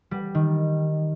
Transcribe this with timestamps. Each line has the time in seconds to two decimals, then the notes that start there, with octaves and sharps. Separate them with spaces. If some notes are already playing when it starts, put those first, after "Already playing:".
0.11 G3
0.35 D#3